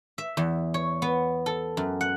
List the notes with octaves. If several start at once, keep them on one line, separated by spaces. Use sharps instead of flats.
E5
E2
C#5
B3
A4
F#2
F#5